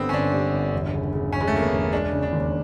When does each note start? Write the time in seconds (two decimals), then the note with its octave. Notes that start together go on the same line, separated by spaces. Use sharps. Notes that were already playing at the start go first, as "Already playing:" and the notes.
Already playing: G1 D3 G3 B3 C4
0.09 C#4
0.13 G1 D4
0.33 G3
0.53 G1
0.73 E1
0.93 C#3
1.13 C#3
1.32 E1 C#4
1.41 G#3
1.47 A3
1.52 E1 A#3
1.63 B3
1.73 E1
1.92 G#3 D4
2.12 C#3
2.23 D4
2.32 D#2